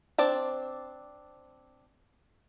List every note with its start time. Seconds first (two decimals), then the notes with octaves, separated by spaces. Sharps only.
0.18 C4 D4 D5